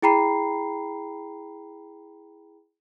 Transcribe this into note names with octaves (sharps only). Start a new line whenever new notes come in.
E4 G#4 G5 A#5 B5 C7